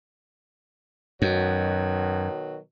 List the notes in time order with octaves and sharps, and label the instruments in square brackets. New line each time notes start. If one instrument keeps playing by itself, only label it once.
[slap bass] F#2 [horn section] B2 D#3 F#3